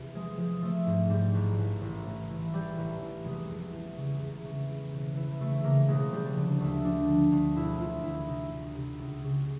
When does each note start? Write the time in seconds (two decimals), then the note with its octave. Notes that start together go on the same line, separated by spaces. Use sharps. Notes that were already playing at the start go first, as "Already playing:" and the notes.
Already playing: E2 C3
0.14 F3 G#3
0.38 F3 G#3
0.62 F3 A3
0.86 G#2
1.10 G#2 G3
1.34 A1
1.58 A1
1.82 A1
2.06 A1
2.30 E3
2.53 E3 G3
2.77 A1
3.01 A1
3.25 F1 G#3
3.50 E2
3.73 E2
3.97 C#3
4.21 E2
4.45 C#3
4.69 E3
4.93 E1
5.16 E3
5.40 C#3 A3
5.64 C#3 A#3
5.88 E1 G#3
6.12 F3 G3
6.37 D3
6.60 D2 A3
6.84 F3 D4
7.08 D3
7.32 D2
7.56 E1 E4
7.80 D2 F4
8.04 D2 E4
8.27 C3 D#4
8.51 D2
8.75 C3
8.99 C#2
9.23 C#3